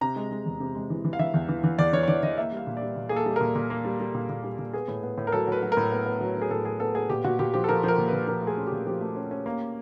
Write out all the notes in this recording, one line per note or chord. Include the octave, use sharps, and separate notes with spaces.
C3 A#5
G#3
G#3
E2
C3
G#3
E3
E3
F5
E3 E5
E2
E3
E3
E2 D5
E3 C#5
C#5
E3 D5
E3 D#5
A#3 E5
G3 F5
A#2
D5
G3
A#2
A#3 G#4
A4
G3
A#2 A#4
A#2
A#3
G3
G3
A#2
A#2
G3
A#2
B3 G#4
A2
B3
A2
A#4
F#3 A4
F#3 B4
F#3
A#4
A2
B3
B3
F#3
F#3
G#4
A2 A4
F#3 G#4
B3 A4
B3 G#4
A#2 G4
A#2 F#4
A#2 G4
F3 G4
A4
F3 A#4
F3
A#4
A#2
B4
A#2
F3 A#4
A3 G#4
C#4
A#2 G4
F3 G4
A3
C#4
C#4
A#3